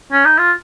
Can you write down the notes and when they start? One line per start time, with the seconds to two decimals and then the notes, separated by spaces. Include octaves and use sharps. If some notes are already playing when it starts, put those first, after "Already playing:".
0.12 C#4
0.25 D#4
0.38 F4